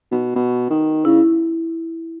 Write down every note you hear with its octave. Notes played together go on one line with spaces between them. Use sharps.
B2
B2
D#3
C#3 E4